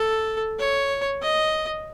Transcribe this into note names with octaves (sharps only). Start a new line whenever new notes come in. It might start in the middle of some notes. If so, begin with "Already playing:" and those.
Already playing: A4
C#5
D#5